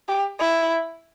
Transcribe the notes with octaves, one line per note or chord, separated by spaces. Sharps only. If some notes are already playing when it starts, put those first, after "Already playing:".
G4
E4